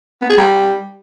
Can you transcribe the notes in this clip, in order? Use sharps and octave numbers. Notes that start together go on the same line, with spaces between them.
B3
G#4
G3